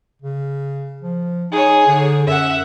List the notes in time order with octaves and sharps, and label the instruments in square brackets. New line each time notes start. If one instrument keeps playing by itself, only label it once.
[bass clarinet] C#3
F3
[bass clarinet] D#4 [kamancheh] G#4 C#5
[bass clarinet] D3
[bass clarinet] F#2 [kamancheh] E5 F#5